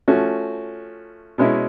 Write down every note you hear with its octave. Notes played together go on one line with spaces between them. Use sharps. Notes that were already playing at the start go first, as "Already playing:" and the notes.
F3 A3 C#4 F#4
B2 G#3 C#4 E4